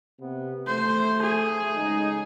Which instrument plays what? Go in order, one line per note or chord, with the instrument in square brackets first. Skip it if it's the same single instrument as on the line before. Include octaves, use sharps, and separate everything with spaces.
[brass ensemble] C3 B3
[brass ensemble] A3 [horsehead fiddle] C5
[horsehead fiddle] G#4
[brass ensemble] C#3 G#3 D#4